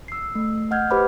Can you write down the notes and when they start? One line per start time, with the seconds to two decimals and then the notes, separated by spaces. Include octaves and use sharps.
0.08 E6 C7
0.35 A3
0.71 D#5 F#5 F6 G6 G#6
0.90 G4 B4 C5 B5 D6 F6